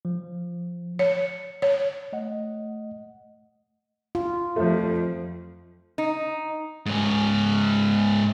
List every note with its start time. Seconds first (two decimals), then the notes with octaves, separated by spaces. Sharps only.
0.05 F3
0.99 C#5 C#7
1.62 C#5
2.13 A3 D#5 F#5
4.15 F4
4.56 F2 F3 A3
5.98 D#4
6.86 G#2 C#4